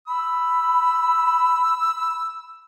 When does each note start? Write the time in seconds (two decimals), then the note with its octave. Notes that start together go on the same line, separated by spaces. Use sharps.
0.08 B5 E6